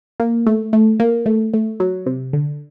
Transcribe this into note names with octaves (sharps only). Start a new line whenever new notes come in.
A#3
A3
A3
A#3
A3
A3
F#3
C3
D3